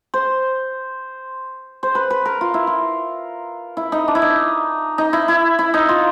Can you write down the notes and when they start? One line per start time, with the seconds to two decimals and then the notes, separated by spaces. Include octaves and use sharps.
0.14 C5
1.83 C5
1.95 B4
2.10 B4
2.25 A#4
2.41 F4
2.54 E4
2.67 F4
3.77 E4
3.92 D#4
4.08 D4
4.15 E4
4.22 D#4
4.98 D#4
5.13 E4
5.28 E4
5.59 E4
5.74 D#4
5.89 F4